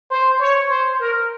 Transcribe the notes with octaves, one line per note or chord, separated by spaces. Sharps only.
C5
C#5
C5
A#4